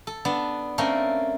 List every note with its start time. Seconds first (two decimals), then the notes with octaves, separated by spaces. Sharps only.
0.07 A4
0.25 B3 D4 A5
0.78 A3 A#3 C4 C#4 A4 A#4